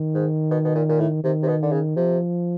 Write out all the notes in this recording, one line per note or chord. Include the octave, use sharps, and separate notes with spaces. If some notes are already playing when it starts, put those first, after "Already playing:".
Already playing: D#3
G#2
B2
B2
A#2
A#2
A2
C3 D#3
C3
B2
D3
C#3
C3 F3